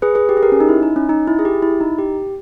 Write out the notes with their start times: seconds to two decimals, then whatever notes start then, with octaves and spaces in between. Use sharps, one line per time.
0.02 G#4 B4
0.15 G#4 B4
0.29 G4
0.37 G#4
0.43 G4 A#4
0.52 C#4
0.60 D#4
0.69 E4
0.83 D#4
0.96 C#4
1.09 D#4
1.27 E4
1.39 G#4
1.45 G4
1.62 E4
1.81 D#4
1.98 G4